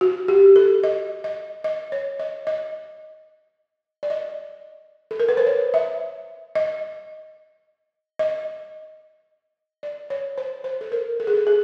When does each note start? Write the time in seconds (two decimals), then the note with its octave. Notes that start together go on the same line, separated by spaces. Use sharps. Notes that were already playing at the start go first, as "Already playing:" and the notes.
0.01 F#4
0.28 G4
0.56 A4
0.84 D#5
1.24 D#5
1.64 D#5
1.92 C#5
2.19 D#5
2.47 D#5
4.03 D5
4.10 D#5
5.11 A4
5.20 A#4
5.29 B4
5.37 C5
5.47 C#5
5.74 E5
6.55 D#5
8.19 D#5
9.83 D5
10.10 C#5
10.38 C5
10.64 C5
10.81 A4
10.92 A#4
11.20 A4
11.27 G#4
11.35 A4
11.47 G#4